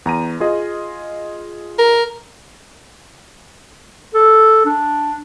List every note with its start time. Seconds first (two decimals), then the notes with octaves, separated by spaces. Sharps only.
0.06 E2 A#5 D#7
0.40 F4 G#4 D#5
1.78 A#4
4.15 A4
4.66 D4